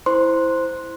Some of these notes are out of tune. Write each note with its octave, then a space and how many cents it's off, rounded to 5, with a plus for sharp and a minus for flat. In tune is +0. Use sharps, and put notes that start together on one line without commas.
E4 +0 C5 -5 C6 +0